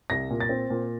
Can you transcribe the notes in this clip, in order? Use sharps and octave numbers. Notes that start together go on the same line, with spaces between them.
C2 A#6
A#2
A6
C4
A#2